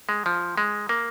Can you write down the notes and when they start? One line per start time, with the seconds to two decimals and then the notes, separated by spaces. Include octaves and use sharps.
0.09 G#3
0.26 F3
0.57 G#3
0.89 A#3